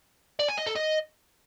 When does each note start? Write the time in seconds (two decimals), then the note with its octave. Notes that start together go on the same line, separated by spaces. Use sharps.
0.39 D5
0.49 G#5
0.58 D#5
0.67 A4
0.76 D#5